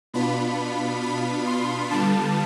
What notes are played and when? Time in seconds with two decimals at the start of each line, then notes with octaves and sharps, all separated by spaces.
0.14 B2 B3 D4 F4 B5
1.03 B5
1.46 C6
1.91 D3 G3 B3 F4 A5